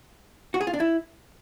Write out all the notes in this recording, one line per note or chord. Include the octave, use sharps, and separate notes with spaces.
F#4
G#4
F4
D4
E4